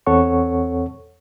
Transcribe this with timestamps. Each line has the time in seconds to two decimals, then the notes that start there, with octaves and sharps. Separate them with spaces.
0.07 E2 C4 A4 C#5 F#5 C#6